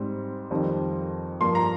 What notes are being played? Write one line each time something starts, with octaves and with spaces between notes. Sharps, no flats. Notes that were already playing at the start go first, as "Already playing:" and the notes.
Already playing: G#2 G3 C4
F2 D#3 G3 C4
G2 F3 A#3 C6
A#5